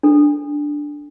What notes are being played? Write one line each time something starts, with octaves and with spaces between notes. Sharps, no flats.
D4 A4